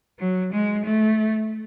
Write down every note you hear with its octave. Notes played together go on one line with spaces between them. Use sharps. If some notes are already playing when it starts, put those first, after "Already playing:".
F#3
G#3
A3